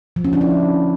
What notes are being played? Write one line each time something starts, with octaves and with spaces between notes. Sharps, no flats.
F3
C#4
D4
E4